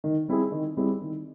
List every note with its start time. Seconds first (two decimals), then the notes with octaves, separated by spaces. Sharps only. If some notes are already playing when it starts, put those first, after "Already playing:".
0.04 D#3
0.28 G3 C4 E4 G#4
0.52 D#3
0.77 G3 C4 E4 G#4
1.01 D#3